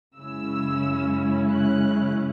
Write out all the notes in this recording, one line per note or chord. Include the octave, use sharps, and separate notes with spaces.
F#2 C#3 G#3 C#4 E4 E6
F#6